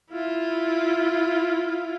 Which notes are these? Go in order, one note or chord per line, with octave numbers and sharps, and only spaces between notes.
E4 F4